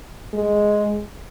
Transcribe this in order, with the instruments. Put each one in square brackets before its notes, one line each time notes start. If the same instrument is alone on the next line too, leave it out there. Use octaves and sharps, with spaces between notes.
[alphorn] G#3